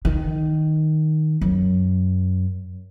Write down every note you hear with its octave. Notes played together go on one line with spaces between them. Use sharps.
D#3
F#2